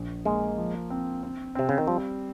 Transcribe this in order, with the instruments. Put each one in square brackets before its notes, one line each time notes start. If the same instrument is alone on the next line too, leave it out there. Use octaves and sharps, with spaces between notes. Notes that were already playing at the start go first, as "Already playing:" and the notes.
Already playing: [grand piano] A#1
[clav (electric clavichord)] G#3 [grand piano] A#3
[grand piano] F3
C4
C4
[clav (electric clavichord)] C3 [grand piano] C4
[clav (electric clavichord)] C#3
D#3
[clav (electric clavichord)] F3 [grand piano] G3